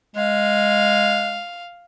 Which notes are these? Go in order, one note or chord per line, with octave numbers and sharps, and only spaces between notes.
G#3 F5